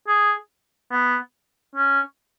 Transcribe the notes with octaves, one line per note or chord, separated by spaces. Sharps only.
G#4
B3
C#4